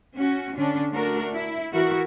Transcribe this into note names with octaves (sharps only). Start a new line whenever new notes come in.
C#4 F#4
D3 C#4 D4
A3 D4 F#4 A#4
E4
E3 E4 F#4 A#4